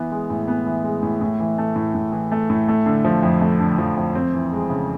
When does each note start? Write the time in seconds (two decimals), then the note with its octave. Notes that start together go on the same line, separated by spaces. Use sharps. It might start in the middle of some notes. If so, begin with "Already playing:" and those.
Already playing: E3 B3
0.11 G#3
0.30 A2
0.48 B3
0.66 E3
0.84 G#3
1.02 A2
1.21 A2
1.40 E3
1.58 A3
1.76 A2
1.94 A2
2.12 E3
2.32 A3
2.50 A2
2.68 A3
2.86 D3
3.05 F3
3.23 F2
3.41 A3
3.60 D3
3.78 F3
3.97 F2
4.15 C4
4.33 E3
4.52 G#3
4.70 C#3